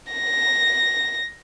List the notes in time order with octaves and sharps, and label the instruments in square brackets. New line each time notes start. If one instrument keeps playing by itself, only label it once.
[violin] A#6